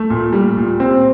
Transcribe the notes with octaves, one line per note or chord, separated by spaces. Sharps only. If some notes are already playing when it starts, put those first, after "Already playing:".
Already playing: A3
A#2
G3
A#2
C4